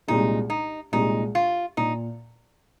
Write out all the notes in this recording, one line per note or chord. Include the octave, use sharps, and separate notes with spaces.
C2 A#2 G#3 D#4
D#4
C2 A#2 G#3 D#4
F4
A#2 D#4